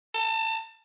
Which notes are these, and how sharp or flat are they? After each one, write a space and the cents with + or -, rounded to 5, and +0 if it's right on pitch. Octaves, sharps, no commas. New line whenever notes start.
A5 +30